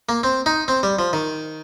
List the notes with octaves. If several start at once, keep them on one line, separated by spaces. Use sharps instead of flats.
A#3
C4
D#4
C4
G3
F3
D#3